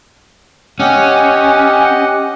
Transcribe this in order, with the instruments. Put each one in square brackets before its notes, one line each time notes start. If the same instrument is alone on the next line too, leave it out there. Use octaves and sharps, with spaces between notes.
[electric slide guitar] C#4 [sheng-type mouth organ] G4 D#5 F#5